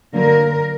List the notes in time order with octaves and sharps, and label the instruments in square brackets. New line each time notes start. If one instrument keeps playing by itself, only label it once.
[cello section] D3 F#3 A#3 A#4